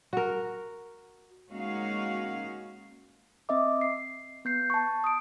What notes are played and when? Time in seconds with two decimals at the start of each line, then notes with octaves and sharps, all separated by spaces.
0.13 F#4 A#4
1.50 G#3 A#3 C#4 D#4 F#4 F5
3.49 C4 D#5 E5 D6
3.81 C7
4.45 B3 G6 C7
4.70 A5 C#6
5.04 D#6 D7